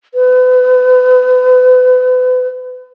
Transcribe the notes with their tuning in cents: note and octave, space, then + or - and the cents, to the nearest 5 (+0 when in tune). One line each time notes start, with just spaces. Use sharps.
B4 +35